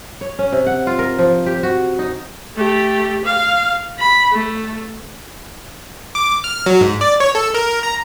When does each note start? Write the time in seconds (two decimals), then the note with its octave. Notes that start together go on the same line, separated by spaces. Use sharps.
0.21 C#5
0.39 C#4
0.53 C3
0.67 F#5
0.87 F4
0.99 A#4
1.18 F3
1.46 G4
1.63 F#4
1.99 D#4
2.56 A3 G4
3.25 F5
3.99 B5
4.32 A3
6.15 D6
6.44 F6
6.66 F#3
6.81 G#2
7.01 D5
7.20 C#5
7.35 A4
7.54 A#4
7.83 A#5